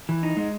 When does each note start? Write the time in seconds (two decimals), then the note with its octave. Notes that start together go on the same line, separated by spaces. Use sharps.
0.09 E3
0.23 D#4
0.37 G#3